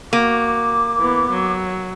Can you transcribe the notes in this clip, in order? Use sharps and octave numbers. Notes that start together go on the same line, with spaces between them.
A#3 F#4 D6
E3 B3
F#3